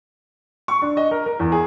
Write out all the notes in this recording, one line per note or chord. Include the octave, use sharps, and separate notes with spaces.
C#6
D4
D#5
A#4
A#4
E2
G#4